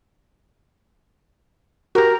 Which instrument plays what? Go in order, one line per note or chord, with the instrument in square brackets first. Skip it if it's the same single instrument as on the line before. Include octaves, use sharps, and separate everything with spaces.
[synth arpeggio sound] F#4 G4 [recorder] A#4